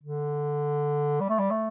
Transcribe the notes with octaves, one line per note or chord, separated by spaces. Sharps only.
D3
G3
A3
G3
A3